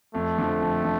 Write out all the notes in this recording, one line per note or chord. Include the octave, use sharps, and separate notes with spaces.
F2 A3
D3 F3
F2
D3